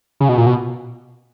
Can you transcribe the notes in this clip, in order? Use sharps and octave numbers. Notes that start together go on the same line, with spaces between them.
C#3
B2
A#2
B2